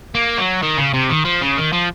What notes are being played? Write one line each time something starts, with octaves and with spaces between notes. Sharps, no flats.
A#3
F#3
D#3
C#3
C3
D#3
F3
C#3
D#3
F3